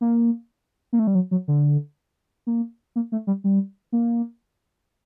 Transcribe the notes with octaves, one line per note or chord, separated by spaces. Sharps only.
A#3
A#3
A3
G3
F#3
F#3
D3
A#3
A#3
A3
G3
G3
A#3